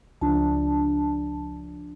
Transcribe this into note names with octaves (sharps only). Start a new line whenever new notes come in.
C#2 F3 D4 A5